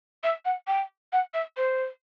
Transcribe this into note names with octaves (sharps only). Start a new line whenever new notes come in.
E5
F#5
G5
F#5
E5
C5